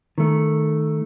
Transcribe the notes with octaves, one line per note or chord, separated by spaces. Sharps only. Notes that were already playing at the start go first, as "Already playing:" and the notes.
D#3 A3